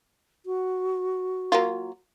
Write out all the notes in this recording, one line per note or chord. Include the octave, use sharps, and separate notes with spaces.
F#4
F#3 A#3 F4